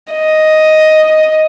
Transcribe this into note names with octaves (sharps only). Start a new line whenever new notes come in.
D#5